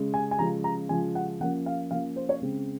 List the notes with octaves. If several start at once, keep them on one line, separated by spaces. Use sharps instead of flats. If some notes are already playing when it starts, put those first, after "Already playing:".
Already playing: C#3 G#3 C#4
G#5
G#5
C#3 F3 G#3 C#4 A#5
A#5
C#3 F3 G#3 C#4 G#5
F#5
F3 A#3 C#4 F#5
F5
F3 A#3 C#4 F5
C5
C#5
C#3 G#3 C4